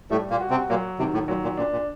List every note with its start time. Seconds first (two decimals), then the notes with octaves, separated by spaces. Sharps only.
0.10 A2 G3 A3
0.30 A#2 A#3
0.41 F#4
0.50 C3 C4
0.70 A#2 F#3 A#3
0.99 C3 D#3
1.14 A2
1.28 A#2 F#3
1.43 A#2
1.57 A#2 D4
1.72 A#2